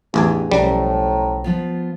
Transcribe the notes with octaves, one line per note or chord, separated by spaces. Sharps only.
A1 E2 D4 D#4 G4 G#4 G#5
B1 A2 F3 G3 C#4 G#5 A#5
F3 B3 F4